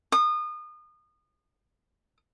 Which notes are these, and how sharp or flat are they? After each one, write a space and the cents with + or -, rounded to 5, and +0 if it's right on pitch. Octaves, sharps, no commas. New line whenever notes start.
D#6 -30